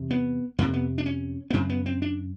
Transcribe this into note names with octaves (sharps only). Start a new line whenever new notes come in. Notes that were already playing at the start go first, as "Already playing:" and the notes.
Already playing: E2 C3
B3
F2 C3 A#3
B3
D4
C#4
B3
F#2 C#3 C4
B3
C4
D4